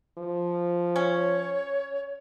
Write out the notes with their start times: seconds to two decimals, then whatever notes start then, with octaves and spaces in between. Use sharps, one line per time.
0.18 F3
0.96 C#4 C#5